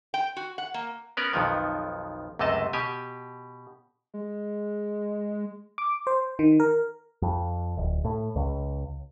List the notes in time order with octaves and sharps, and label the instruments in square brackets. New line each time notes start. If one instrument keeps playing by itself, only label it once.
[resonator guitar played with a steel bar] G5
F#4
F#5
A#3
[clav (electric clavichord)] B3 C#4 A#4 B4 D5
B1 F2 D#3 F3 B3
C#2 F#2 C3 A3 D#5 A5
B2 G4 G#5
[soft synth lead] G#3
[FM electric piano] D6
C5
D#3
A#4
[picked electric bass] F2
D1
A2
C#2